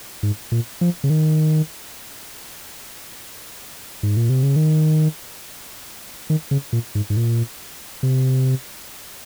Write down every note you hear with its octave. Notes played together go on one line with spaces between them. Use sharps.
G#2
A#2
F3
C#3
D#3
G#2
A#2
C3
C#3
D#3
D#3
C#3
A#2
G#2
G#2
A#2
C3